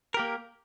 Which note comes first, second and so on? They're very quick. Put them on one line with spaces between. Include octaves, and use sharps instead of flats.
A#4 G4 A#3